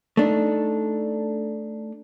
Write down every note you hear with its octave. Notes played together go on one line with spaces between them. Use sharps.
A3 D4 D#4